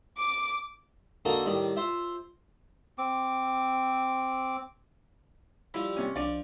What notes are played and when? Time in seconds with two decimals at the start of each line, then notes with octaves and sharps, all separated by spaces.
0.18 D6
1.25 D3 A#3 D#4 F#4 A4 A#4
1.46 A2 D#3 G3
1.76 F4 C5 E5
2.98 C4 D6
5.74 F3 G3 E4
5.97 C3 C#4
6.16 C2 F3 D4 D5